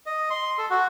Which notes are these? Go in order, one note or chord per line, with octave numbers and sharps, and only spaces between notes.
D#5
C6
A4
F#4